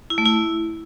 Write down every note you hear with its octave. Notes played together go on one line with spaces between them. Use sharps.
E4
A3
E4